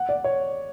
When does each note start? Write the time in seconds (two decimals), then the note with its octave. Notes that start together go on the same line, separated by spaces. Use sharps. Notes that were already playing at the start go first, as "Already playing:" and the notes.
Already playing: F#5
0.09 D5
0.24 C#5